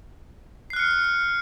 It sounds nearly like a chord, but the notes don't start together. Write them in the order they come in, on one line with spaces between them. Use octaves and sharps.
C7 F#6 F6 C#7